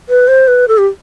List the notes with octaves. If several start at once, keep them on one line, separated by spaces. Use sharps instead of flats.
B4
C5
B4
A4
G4